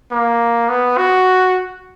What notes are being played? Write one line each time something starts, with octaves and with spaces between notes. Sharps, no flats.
A#3
B3
F#4